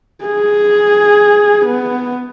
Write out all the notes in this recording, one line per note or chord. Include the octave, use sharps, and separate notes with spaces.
G#4
B3